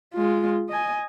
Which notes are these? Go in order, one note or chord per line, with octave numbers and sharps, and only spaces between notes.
G#3 F4
D#5 G#5